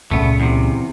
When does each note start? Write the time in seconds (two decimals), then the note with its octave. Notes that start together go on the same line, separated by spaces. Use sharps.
0.11 C#2 A#2 C#3 A3 B3
0.40 E2 C3